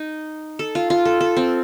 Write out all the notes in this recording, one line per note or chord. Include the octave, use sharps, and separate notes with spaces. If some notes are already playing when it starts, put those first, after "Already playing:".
Already playing: D#4
A4
F4
F4
A4
A4
C4